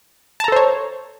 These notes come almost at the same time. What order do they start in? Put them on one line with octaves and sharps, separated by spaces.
A5 A#5 A4 C5 C#5